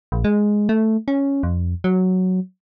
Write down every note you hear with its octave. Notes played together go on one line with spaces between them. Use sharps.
A#1
G#3
A3
C#4
F2
F#3